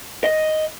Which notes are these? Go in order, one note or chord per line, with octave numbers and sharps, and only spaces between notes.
D#5